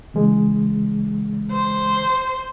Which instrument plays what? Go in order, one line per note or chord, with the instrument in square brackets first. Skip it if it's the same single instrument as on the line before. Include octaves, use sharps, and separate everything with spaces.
[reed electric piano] C#3 E3 G#3
[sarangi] C5